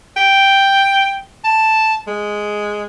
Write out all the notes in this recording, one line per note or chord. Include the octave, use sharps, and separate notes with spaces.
G5
A5
G#3